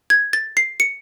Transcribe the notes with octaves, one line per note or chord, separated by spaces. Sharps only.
G#6
A6
C7
C#7